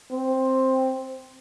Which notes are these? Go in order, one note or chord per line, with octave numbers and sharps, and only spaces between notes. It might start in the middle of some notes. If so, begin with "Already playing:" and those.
C4